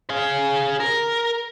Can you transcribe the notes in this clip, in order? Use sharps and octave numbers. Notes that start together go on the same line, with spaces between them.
G#4 F5
A#4